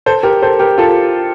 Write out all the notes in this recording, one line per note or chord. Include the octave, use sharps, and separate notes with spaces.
A4 C5
G4 A#4
A4 C5
G4 A#4
F4 A4